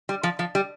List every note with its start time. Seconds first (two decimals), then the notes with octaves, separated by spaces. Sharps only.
0.09 G3
0.23 F3
0.39 F3
0.55 G3